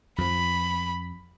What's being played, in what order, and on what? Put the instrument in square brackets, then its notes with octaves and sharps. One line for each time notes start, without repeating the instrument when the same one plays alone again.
[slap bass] F2 F3 [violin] B5